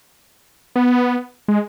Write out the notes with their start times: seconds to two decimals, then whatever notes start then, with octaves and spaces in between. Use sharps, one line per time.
0.76 B3
1.48 G#3